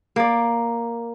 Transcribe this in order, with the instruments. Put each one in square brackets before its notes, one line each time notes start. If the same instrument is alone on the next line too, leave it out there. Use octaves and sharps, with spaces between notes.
[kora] A#3 D5